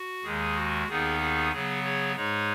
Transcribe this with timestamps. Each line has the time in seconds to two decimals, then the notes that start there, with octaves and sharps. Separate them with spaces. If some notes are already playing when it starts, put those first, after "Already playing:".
Already playing: F#4
0.23 D#2 D#3 G#3 G#4
0.55 F#4
0.87 D#2 D#3 B3 D#4 G#4
1.20 G#4
1.51 C#3 F#3 B3 G#4
1.84 G#4 C#5
2.16 G#2 G#3 D#4 G#4 C#5